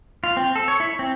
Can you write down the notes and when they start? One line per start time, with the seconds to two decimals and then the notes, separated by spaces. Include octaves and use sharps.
0.24 F4
0.37 C4
0.56 A4
0.68 C#5
0.80 E4
0.99 C4